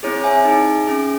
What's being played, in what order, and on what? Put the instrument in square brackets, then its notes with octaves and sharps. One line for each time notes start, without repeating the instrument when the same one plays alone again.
[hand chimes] C4 E4 G#4 C#5
E5 G#5
D#4 G#4
C#4 G#4